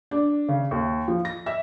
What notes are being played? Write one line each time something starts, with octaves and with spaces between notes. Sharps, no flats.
D4
C#3
D#2
F3
A#6
E5